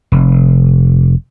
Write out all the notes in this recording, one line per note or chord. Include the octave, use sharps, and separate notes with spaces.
F1